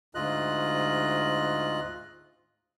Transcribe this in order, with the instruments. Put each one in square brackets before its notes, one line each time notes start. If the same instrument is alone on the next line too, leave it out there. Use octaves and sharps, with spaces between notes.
[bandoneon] D2 G#2 F4 D#5 F#6